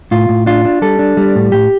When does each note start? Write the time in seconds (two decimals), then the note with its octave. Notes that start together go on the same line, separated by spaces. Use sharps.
0.11 A2 F4
0.29 A2
0.46 D4 F4
0.65 D4
0.82 G3 A4
0.99 D4
1.17 G3
1.36 A2
1.52 A2 G4